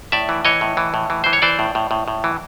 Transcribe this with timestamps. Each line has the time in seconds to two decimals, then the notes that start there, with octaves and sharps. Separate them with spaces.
0.12 A2 D5 E5
0.29 E3
0.45 E3 C#5 D#5
0.61 A2
0.77 E3
0.94 A2
1.10 E3
1.24 E3 C5
1.33 C#5
1.42 E3 C5 D5
1.59 A2
1.75 A2
1.91 A2
2.08 A2
2.24 E3